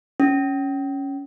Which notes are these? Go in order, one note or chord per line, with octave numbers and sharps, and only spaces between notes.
C#4